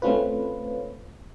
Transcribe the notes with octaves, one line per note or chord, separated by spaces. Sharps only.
A3 C4 C#4 F4 B4